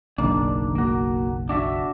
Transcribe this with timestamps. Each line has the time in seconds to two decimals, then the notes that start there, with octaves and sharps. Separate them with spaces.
0.18 F#1 B1 D#3 A#3 D4
0.75 A#3 F#4
1.49 D4 F#4 E5